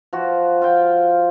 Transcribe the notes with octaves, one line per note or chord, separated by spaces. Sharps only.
F3 F#4
F4 F5 G5